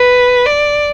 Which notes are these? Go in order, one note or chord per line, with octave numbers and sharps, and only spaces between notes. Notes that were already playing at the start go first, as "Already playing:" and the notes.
Already playing: B4
D5